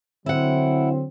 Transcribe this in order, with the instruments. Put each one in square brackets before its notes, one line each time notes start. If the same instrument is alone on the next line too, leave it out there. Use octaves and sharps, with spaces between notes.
[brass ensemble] D3 F#3 C4 [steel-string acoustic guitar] E4 F#5